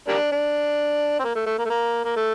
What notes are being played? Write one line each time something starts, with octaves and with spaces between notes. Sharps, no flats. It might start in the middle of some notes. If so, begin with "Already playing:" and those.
G3 A#3 D4
D4
C4
A#3
A3
A3
A#3
A3
A#3
A#3
A3